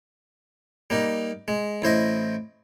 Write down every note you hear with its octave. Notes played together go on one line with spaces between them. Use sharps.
G3 A#3 D#4
G#3
A1 E4 C5 D#5